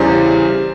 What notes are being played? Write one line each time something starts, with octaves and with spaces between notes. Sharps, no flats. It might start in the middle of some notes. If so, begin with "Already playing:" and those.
Already playing: E2 C#3 E3 G3 C5 D5